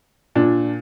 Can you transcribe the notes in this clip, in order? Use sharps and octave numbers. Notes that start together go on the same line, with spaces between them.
A#2 D4